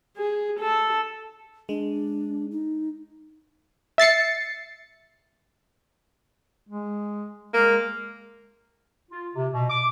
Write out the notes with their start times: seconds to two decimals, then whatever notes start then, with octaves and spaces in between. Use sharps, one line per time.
0.17 G#4
0.60 A4
1.69 G#3 D4
2.51 D#4
3.98 E5 A6 C7 C#7
6.68 G#3
7.54 G#3 A#3
9.11 F4
9.35 C3
9.54 B2
9.70 D6